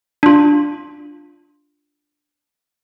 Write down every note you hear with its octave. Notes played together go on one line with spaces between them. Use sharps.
D4 F4